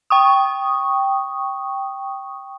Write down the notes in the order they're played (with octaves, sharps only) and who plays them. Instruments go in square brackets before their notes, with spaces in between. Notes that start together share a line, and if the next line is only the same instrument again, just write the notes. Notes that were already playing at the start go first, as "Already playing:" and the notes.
[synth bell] G5 C#6 D#6